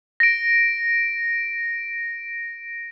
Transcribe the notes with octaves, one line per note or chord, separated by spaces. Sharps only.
A#6 D7